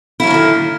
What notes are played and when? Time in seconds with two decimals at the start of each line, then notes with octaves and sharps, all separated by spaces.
0.20 E4
0.23 F#3
0.27 A#3
0.30 D#3
0.34 D3